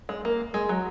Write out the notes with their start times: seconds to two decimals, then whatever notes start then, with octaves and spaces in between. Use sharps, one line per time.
0.09 G#3
0.25 A#3
0.54 G#3
0.69 F#3